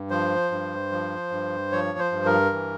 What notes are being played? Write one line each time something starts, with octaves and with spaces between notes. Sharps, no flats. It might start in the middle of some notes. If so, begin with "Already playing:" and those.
Already playing: G2
F3 C5
G2
F3
G2
F3 C#5
C5
G2
A#4
E3